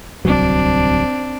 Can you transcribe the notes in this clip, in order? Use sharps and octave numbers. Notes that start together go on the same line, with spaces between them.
D1 C2 F#3 C4 D4